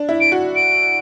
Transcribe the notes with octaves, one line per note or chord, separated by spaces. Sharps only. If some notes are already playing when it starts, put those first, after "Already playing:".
Already playing: D4
E4
D7
F#4
D7